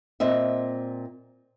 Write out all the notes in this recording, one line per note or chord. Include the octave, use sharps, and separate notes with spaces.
A#2 C4 D#5 E5